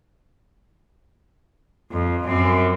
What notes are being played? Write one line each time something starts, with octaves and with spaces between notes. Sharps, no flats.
F2
F#2 C4